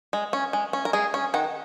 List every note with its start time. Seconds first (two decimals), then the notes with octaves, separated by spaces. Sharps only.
0.13 G#3
0.33 C#4
0.53 G#3
0.73 C#4
0.85 A#4
0.93 G#3 G#4
1.14 C#4
1.34 D#3 F#5